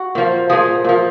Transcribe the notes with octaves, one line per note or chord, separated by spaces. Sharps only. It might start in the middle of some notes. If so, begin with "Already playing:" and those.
Already playing: F#4
A#2 F3
A#2 F3 G#4
A#2 F3